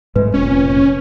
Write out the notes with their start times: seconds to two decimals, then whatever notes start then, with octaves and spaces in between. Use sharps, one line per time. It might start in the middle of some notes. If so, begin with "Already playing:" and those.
0.16 G#2 G#3 A3 B4
0.34 F1 A#2 C4 C#4